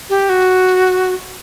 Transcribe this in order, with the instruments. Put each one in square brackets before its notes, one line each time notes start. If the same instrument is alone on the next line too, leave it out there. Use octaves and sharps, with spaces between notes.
[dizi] G4
F#4